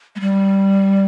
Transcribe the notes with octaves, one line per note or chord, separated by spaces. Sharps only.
G#3
G3